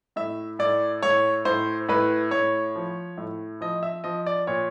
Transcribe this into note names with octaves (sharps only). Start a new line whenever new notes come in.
A2 E5
A2 D5
A2 C#5
A2 C5
A2 B4
A2 C#5
F3
A2
F3 D#5
E5
F3 D#5
D5
A#2 C#5